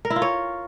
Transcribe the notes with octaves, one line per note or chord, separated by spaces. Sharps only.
A#4
E4
F4
C#5